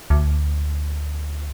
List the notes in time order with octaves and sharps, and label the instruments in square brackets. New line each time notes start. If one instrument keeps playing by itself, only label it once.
[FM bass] D2